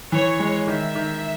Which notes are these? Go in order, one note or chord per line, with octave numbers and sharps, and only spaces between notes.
E3 C#5
G#3
D#3 E5
D#3